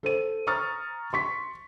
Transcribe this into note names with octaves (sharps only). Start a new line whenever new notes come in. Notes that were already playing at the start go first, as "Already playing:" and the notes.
A4 C5 D#7
A#5 C#6 D#6 F6 A6
C6 C#6 B6